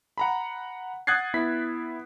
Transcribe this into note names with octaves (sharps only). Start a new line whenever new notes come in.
F#5 A#5 B5
F#5 D#6 F#6 G#6 A6 C7
B3 E4 B6